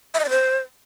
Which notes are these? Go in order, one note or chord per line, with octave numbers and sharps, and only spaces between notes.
E5
D#5
D5
C5